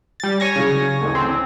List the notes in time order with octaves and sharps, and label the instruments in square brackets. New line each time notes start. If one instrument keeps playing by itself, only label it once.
[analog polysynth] G3 A6
C#5 G#5 A#6
[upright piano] C#3 F#3
A1 D2
[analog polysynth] C4